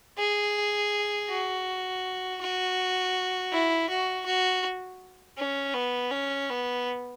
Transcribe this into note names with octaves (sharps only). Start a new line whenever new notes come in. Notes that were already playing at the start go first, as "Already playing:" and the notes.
G#4
F#4
F#4
E4
F#4
F#4
C#4
B3
C#4
B3